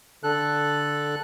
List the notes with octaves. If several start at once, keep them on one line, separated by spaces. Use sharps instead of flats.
D3 A4 F#6